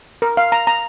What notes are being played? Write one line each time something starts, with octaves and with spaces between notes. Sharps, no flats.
A#4
F5
A#5
A#5